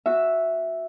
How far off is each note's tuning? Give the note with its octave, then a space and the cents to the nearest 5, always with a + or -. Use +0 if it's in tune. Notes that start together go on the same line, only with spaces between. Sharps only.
F#4 -10 E5 +0